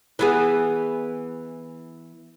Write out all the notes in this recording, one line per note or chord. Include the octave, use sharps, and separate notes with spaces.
E3 B3 G#4